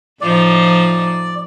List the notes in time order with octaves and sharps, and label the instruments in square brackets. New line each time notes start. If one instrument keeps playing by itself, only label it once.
[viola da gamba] A2 F3 D#4 [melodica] D5